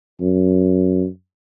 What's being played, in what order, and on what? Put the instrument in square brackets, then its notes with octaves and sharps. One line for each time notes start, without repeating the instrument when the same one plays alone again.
[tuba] F#2